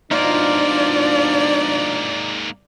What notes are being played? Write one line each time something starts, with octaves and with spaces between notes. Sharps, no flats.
G#2 B2 F3 A#3 D4 D#4 F4 D5